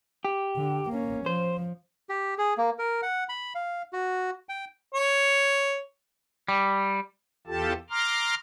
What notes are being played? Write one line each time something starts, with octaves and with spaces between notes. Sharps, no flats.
G4
D3
A#3 C#4
F3 C5
G4
G#4
A#3
A#4
F#5
B5
F5
F#4
G5
C#5
G3
E2 F4 G4 A4 A5
A#5 C6 D6 F6